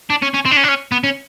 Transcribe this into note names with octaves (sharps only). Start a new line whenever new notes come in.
D4
C#4
C#4
C4
D4
C#4
D4
C#4
B3
C#4